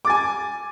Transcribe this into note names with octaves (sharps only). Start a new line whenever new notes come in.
G#5 D6 A6